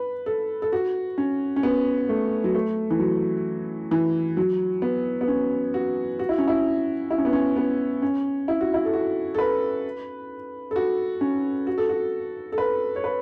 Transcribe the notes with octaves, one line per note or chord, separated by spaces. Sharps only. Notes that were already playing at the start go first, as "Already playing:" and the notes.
Already playing: B4
A4
A4
F#4
C#4
C#4
B3
A3
F#3
A3
E3
F#3
E3
F#3
B3
B3
C#4
F#4
F#4
E4
C#4
E4
E4
C#4
B3
C#4
B3
C#4
E4
F#4
E4
A4
F#4
A4
B4
A4
F#4
C#4
F#4
A4
F#4
A4
B4
C#5
B4